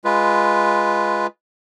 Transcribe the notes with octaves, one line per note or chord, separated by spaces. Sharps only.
G#3 F4 B4